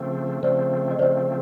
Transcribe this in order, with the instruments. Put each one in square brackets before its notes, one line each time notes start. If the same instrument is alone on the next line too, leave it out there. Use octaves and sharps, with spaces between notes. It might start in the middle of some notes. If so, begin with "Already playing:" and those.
Already playing: [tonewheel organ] C#3 F3 A3 C4
[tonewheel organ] C#3 F3 A3 C4 [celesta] C5 D5
[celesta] D#5
[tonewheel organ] C#3 F3 A3 C4 [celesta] C5 D5